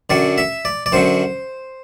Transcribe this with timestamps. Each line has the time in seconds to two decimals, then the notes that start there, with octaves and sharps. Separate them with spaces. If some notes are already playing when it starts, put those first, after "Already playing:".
0.10 F#2 D3 F#3 D5
0.38 E5
0.65 D5
0.86 D5
0.92 F#2 D3 F#3 C5